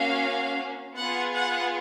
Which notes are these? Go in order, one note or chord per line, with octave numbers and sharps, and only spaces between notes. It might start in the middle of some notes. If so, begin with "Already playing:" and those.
Already playing: A#3 C#4 F#4 F5
B3 F4 G#4 F#5
F#5